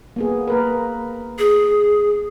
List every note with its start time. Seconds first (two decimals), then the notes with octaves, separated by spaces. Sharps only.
0.16 A#3 B3 G#4
0.48 A#3 A#4 B4
1.39 G#4